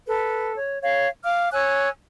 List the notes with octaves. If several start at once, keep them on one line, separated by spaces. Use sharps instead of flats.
A4 B4
C#5
C#5 F5
F5 D6 F6
C#5 G#5 E6 F#6